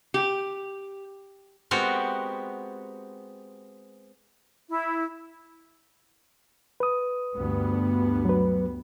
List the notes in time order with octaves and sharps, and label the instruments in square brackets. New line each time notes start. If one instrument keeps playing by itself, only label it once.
[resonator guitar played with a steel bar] G4
[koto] G#3 B3 C4 F#4 G4 A#4
[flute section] E4
[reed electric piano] B4 D#6
[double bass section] D2 G2 B3
[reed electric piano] F#3 B4